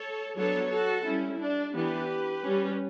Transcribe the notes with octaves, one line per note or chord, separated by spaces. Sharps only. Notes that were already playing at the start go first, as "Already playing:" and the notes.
Already playing: A4 C#5
F#3 B3 D4 A4 C#5
F#4 A4
G3 C#4 E4
D4
E3 B3 D4 G4 B4
G3 C#4